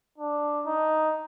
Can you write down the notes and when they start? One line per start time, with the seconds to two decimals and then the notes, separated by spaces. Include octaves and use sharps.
0.18 D4
0.66 D#4